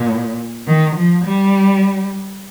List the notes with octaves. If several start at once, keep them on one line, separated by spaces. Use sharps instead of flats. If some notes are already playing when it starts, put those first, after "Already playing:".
Already playing: A#2
D#3
F3
G3